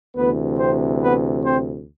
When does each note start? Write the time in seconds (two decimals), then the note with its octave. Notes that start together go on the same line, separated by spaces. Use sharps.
0.16 D2 C3 E3 B3 B4
0.58 C4 C5
1.02 B3 B4
1.44 C4 C5